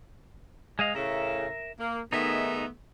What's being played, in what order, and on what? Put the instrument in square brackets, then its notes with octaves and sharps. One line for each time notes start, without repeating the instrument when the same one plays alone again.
[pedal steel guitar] G#3 D#5 F5
[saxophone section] A2 C#3 [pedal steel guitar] A#4 E5
[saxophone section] A#3
[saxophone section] D#3 A3 B3 [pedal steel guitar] D#4 G#4 E5